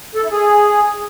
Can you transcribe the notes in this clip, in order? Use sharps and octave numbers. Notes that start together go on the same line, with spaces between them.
A4
E4
G#4